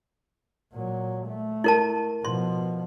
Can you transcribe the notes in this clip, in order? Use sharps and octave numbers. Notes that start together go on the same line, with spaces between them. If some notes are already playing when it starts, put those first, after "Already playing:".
A#2 F#3
A3
E4 A#4 A5
B2 F3 C6